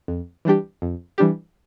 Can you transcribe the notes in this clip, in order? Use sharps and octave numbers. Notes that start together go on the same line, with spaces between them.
F2
E3 G3 D4 G4
F2
E3 G3 D4 G4